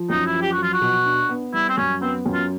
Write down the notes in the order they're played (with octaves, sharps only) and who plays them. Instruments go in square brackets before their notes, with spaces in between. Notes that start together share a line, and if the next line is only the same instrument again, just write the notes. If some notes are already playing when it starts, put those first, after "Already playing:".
Already playing: [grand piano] F3
[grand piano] F#2 [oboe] D#4
[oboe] E4
[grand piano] F3
[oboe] G4
F#4
[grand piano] F#3
[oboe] F4
F#4
[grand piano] B2
D4
B3
[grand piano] G3 [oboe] E4
[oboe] C4
[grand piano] F#2 [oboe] C#4
[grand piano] B3 [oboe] C4
[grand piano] F#2
[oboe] F4